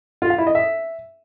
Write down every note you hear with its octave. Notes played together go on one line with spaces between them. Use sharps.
F4
F5
E4
D#5
E5